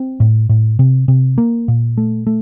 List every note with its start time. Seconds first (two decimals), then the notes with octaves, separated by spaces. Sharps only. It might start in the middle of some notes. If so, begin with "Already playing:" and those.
Already playing: C4
0.20 A2
0.49 A2
0.79 C3
1.08 C3
1.38 A#3
1.68 A#2
1.98 A3
2.27 A3